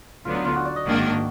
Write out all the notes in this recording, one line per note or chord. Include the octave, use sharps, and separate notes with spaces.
D2 D3 F#3 B3 F4
D#4
F4
F#4
D5
D#5
G#1 G#2 D#3 A#3 D4